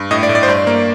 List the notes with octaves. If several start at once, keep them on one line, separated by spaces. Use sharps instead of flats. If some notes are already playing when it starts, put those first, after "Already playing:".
Already playing: G2
A2 D#5
D5
A2
D5
C5
G2 D5
A#3